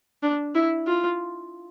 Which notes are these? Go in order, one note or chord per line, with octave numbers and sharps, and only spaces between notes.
D4
E4
F4